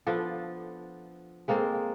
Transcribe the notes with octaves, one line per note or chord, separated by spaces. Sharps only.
F3 B3 D4 A4
G#3 A#3 C4 A4